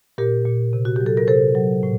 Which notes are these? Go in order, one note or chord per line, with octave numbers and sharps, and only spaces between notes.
A#2 G4 A#4
A#2
C3
F#4
F#3 G4
A4
A#4
C3 A4 C5
F#3
A2